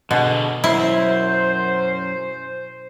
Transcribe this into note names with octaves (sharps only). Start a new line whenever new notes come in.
B2 D3 G#4
F#2 E4 C5